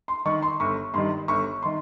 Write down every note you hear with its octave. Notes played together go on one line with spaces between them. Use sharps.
C6
D#3 C#6
C6
G1 C#6
G2 D#3 C6
G1 C#6
D#3 C6